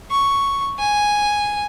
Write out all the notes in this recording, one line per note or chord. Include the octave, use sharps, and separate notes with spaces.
C#6
G#5